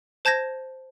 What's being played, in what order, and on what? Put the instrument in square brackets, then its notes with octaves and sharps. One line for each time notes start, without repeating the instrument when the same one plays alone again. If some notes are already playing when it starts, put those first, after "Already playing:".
[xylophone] C5 A5 G6 G#6 A#6 E7